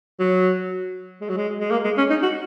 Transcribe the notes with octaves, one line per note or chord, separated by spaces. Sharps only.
F#3
G#3
F#3
G#3
G#3
A#3
G#3
C#4
D#4
F#4